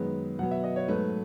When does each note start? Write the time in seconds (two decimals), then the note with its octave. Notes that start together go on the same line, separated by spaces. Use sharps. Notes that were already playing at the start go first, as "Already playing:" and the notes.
Already playing: F#2 D#3 G#3 B3 B4
0.39 B2 F#3 B3 F#5
0.51 E5
0.64 D#5
0.76 C#5
0.88 G#2 F#3 A3 B4